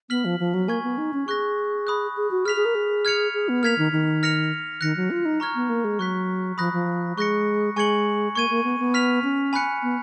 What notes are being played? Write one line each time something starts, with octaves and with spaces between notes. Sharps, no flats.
B3 F6 B6 F#7
F3
F3
F#3
A#3 G#5 C#6 G#6
B3
D#4
C#4
G#4 C#6 F#6 A#6
B5 D#6 F#6
G#4
F#4
G#4 F6 B6 F7
G#4
A#4
G#4
F6 G#6 C#7 F7
G#4
B3
A#3 F6 G#6 B6 F7
D#3
D#3
F6 A#6 C#7 F7
D#3 F#6 A#6 C#7
F#3
F4
D#4
A#5 C#6 F6 G#6
B3
A#3
G#3
F#3 C#6 F#6 B6
F3 B5 D#6 F#6 A#6
F3
G#3 C#6 F#6 A#6 C#7
G#3 G#5 C#6 G#6 C#7 F#7
A#3 C#6 G#6 D#7
A#3
B3
B3
F6 B6 F7
C#4
G#5 B5 F#6 C#7
B3